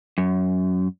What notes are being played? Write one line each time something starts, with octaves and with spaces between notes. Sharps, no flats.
F#2